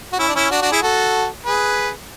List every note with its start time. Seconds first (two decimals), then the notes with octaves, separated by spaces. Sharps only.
0.13 F#4
0.19 C#4 E4
0.28 D4
0.36 C#4 E4
0.51 D4 F#4
0.62 D4 F#4
0.72 E4 G#4
0.82 F#4 A4
1.46 G#4 B4